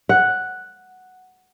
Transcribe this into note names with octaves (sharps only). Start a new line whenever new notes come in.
F#5